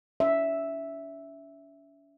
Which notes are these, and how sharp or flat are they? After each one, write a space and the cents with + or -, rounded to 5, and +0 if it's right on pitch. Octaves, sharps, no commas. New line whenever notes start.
C#4 +45 E5 +0